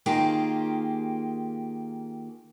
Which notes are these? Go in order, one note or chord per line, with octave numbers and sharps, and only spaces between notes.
D#3 A#3 F4 G4 G#4